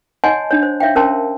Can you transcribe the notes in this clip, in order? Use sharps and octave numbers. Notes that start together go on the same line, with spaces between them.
C#5 D#5 F#5 G#5 A5 C6
D4 C#5
C5
C#5 E5 F5 G5
C#4 A#4 C5 G5 A5 C6